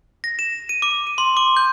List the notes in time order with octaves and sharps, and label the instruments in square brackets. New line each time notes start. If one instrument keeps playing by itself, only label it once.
[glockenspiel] A#6
E7
D#7
D6
D#7
C6
D6
G6